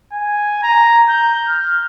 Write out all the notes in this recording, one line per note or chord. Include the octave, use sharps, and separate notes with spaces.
G#5
A#5
G6
F6